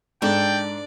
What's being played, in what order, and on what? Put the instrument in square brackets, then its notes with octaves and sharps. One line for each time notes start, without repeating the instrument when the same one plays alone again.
[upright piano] G#2 [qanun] D4 A4 [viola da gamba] D5 [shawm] G5